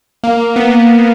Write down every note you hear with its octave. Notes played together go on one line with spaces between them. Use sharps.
A#3
A#3
B3
B3